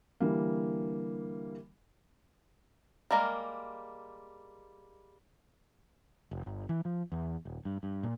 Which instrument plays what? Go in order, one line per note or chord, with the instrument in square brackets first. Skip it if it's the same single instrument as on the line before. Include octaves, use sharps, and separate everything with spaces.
[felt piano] D3 E3 G3 A#3
[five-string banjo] G3 G#3 A#3 A#4
[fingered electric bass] F1
G1
E3
F3
E2
D#1
G2
G2
A#2